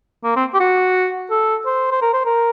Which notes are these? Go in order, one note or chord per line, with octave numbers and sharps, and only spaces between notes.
A#3
C4
G4
F#4
A4
C5
C5
A#4
C5
A#4